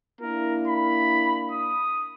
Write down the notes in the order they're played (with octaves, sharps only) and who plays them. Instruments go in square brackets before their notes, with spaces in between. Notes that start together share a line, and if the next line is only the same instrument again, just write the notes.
[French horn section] A#3 D4 E4 [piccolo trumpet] A#4
[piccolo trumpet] B5
D#6